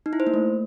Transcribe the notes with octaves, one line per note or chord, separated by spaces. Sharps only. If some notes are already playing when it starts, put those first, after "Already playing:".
D#4
E4
C5
A#3
A3